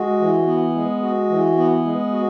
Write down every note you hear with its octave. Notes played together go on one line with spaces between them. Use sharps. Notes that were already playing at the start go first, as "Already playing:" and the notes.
Already playing: G#3 F#4
E3
B3
G#3
F#4
E3
B3
G#3
F#4